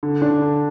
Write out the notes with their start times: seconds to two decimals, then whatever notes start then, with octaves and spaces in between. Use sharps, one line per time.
0.03 D3
0.22 D4
0.42 D3